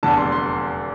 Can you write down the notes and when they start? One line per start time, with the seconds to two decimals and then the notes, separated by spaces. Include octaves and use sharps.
0.03 F1 E2 D3 A5
0.17 C6
0.32 C6
0.46 C6